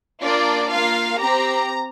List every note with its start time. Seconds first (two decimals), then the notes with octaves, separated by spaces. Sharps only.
0.23 A#3 D4 F4 D5
0.71 A#3 F4 F5
1.20 C4 G4 A#5